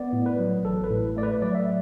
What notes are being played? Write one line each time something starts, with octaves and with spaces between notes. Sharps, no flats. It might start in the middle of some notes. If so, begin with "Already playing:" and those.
Already playing: B3 D5
A2
B4
F#3
A1 A4
B4
A2
A3 D5
B4
F#3 D5
E5